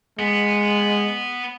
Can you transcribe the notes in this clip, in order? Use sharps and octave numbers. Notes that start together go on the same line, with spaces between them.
G#3 B3